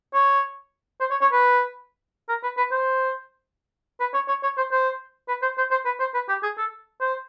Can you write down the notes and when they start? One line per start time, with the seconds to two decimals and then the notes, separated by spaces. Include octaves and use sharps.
0.14 C#5
1.00 C5
1.11 C#5
1.22 C#5
1.32 B4
2.29 A#4
2.43 B4
2.57 B4
2.71 C5
4.00 B4
4.14 C#5
4.28 C#5
4.43 C#5
4.57 C5
4.72 C5
5.28 B4
5.43 C5
5.58 C5
5.71 C5
5.86 B4
6.00 C5
6.14 B4
6.29 G4
6.43 G#4
6.58 A4
7.01 C5